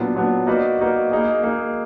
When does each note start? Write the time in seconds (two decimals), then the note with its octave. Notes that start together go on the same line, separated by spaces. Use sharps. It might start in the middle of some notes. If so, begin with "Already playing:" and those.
Already playing: A#2 F#3 B3 D4
0.16 A#2 F#3 B3 D4
0.47 A#3 D#4 F#4 B4 D5
0.79 A#3 D#4 F#4 B4 D5
1.11 A#3 D#4 G#4
1.43 A#3 D#4 G#4